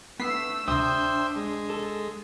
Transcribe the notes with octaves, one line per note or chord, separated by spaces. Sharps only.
A3 B3 E6 B6 C7
D2 C3 D4 C5 E5 G5 D#6
G#3
A4